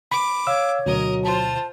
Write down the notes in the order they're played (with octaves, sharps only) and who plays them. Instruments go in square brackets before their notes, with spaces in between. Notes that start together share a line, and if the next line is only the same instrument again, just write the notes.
[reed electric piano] B5 [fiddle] D6
[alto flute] C#5 [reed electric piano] F5 E6
[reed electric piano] D2 B2 [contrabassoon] F#3 [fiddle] A#4 D#5
[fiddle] F4 C5 [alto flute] A5